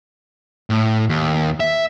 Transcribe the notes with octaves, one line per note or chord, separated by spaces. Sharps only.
A2
D#2
E5